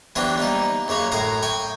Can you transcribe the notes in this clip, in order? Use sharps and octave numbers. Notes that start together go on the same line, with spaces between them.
E3 F#3 B3 C4 D4 G4
G3 A#3 D#4
F#2 C#3 A#3 C#5
F#2 A2 G#4 F5 A#5
G5 G#5 C#6